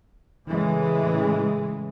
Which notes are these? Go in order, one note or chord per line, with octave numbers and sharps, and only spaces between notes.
A2 C#3 E3 G#3